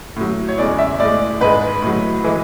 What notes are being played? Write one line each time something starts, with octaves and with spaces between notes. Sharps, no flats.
A2 F#3
C#5
E2 C#3 G#3 D5
E5
A2 G#3 D5
G#2 G#3 B4
A2 F#3
E3 G#3